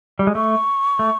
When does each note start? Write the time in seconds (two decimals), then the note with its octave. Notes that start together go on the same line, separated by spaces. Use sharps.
0.19 G3
0.27 G#3
0.35 A3 C#6
0.99 A3